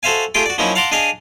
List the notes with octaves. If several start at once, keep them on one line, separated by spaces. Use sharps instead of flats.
F#4 A4 C5 E5 F5 G#5
A3 F4 G4 G#4 G5
F#4 D5
F3 F#3 A#3 C#4 D#4 E4
F5 F#5 A5 A#5 C6 D6
D4 G#4 D#5 F5 G#5